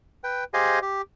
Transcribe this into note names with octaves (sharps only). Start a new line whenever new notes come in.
B4 G5
G4 G#4 C5 D#5 F5 G#5
G4